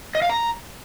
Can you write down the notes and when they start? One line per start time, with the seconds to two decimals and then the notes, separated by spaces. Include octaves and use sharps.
0.15 D#5
0.22 F5
0.29 A#5